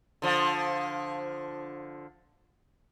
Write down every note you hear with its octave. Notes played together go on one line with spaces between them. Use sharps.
D3 F3